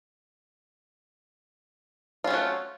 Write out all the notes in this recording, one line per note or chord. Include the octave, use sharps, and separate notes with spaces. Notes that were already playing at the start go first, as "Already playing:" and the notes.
F#3 A3 C#4 F4